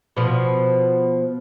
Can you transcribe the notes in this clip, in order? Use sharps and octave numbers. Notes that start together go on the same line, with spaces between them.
B2 F3